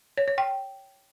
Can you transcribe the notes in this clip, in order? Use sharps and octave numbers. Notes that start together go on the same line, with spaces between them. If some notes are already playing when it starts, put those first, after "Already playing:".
C#5
C#5
G5